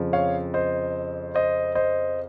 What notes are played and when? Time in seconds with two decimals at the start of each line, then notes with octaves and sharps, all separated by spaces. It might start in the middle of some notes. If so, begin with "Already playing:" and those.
Already playing: F2 C#3 F3
0.13 C#5 F5
0.54 C5 D#5
1.35 C5 D#5
1.75 C5 D#5